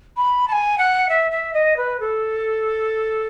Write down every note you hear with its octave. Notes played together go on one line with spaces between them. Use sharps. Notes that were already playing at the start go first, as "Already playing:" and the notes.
B5
A5
G#5
F#5
E5
E5
D#5
B4
A4